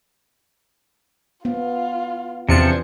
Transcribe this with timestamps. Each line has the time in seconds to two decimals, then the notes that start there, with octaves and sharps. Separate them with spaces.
1.45 B3 F4
2.48 E2 C3 E3 F3 D4 C5 G#5 C#7